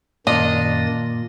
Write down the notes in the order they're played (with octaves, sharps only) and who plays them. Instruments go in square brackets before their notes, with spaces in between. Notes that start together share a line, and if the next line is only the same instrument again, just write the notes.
[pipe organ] F#2 D#3 A6 [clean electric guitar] A#2 [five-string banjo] D4 F4 D5 [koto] D#5